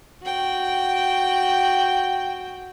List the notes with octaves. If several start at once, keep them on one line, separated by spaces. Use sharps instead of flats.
F#4 G5